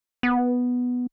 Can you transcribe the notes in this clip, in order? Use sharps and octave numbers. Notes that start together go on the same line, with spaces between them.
B3